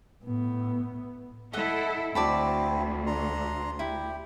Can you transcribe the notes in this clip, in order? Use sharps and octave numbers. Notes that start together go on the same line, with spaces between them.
A2 B3
E4 A4 D#5 E5 F#5
D2 C4 E4 F#4 D5 A5 B5
D4 A#5 C6
E4 G4